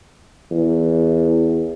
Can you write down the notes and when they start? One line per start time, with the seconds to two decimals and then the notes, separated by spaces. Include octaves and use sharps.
0.51 E2